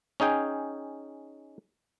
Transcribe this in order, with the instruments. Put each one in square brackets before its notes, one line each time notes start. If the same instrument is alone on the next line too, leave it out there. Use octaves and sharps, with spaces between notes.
[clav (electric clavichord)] C#4 D#4 G#4 G5